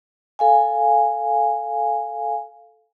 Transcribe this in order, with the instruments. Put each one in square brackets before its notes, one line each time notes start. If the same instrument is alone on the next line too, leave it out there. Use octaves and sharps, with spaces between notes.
[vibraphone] A4 F5 G#5